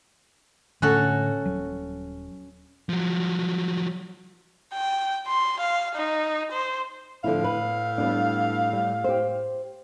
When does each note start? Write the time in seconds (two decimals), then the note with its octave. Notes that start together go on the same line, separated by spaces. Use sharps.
0.82 A2 D3 A3 C#4 F#4 A4
1.46 D#1 F#3
2.89 F3 F#3
4.74 G5
5.27 C6
5.59 F5
5.95 D#4
6.52 C5
7.24 A2 D3 F3 E4 F5
7.44 B4
7.98 G3 B3 D4
8.73 G3
9.04 G4 C5